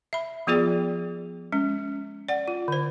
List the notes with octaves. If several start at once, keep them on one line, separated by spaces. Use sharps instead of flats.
E5 B5
F3 B3 F4 G#4 D5 G5
G#3 C#4
D5 F#5
F4
D3 C5